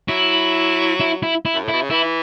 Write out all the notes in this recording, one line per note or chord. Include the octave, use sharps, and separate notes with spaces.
F#3 E4
E4
E4
E4
F#2
A2
B2 E4
C#3
E3 E4